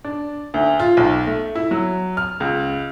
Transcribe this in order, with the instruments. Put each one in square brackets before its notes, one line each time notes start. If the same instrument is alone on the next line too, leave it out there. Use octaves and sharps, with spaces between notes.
[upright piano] D4
D2
F4
B1
A3
E4
F#3
F6
C#2